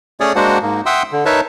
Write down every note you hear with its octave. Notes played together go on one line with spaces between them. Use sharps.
A3 C#4 G#4 C#5 D5 D#6
G#3 A#3 D4 F#4 C5 F#5
G#2 A#3
E5 F#5 G5 C6 D#6 E6
D3
D#4 A#4 B4 C#5 E5 A5